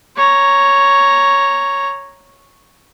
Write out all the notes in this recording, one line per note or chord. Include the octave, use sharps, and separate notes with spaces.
C#5 A#5